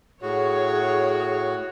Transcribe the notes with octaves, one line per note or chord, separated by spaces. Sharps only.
A2 F#4 G#4 C#5